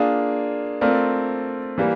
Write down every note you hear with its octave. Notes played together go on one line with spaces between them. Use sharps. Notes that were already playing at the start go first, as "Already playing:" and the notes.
Already playing: A#3 D4 F4 G#4
A3 C4 F4 A#4 D5
E3 G3 A#3